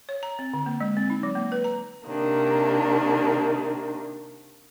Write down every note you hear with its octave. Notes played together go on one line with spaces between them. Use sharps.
C#5
A#5
C4
D3
A#3
G#3
C4
D#4
F#3
A#3
B4
A#5
C3 D#3 A#3 D4